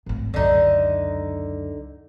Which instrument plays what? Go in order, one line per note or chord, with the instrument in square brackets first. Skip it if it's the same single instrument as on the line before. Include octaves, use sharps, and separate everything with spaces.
[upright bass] G#1 A2
[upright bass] C#2 F#2 [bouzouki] D3 D#4